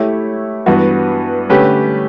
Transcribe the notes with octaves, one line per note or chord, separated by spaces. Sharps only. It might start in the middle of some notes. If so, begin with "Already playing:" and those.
Already playing: A3 E4 G4 C#5 E5
G2 E3 B3 F#4
D3 A3 C#4 G4 B4